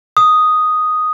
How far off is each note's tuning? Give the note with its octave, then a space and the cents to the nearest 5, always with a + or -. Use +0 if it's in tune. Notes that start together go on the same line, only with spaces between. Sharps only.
D#6 +0